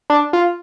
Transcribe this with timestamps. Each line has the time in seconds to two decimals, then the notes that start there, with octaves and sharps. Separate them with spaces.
0.10 D4
0.33 F4